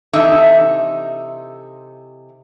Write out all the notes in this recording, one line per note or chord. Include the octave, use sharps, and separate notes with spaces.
C3 E3 D#4 A4 E5